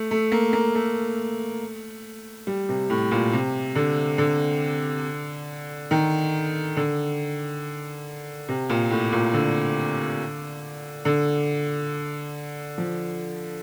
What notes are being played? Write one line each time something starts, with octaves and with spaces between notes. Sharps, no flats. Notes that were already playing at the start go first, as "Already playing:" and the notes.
Already playing: A3
A3
A#3
A#3
A3
G3
C3
A2
A#2
C3
D3
D3
D#3
D3
C3
A#2
A2
A#2
D3
D3
F3